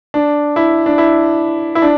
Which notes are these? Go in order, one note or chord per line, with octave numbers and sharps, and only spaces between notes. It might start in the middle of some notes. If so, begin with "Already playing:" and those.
D4
E4
D4
E4
E4
D4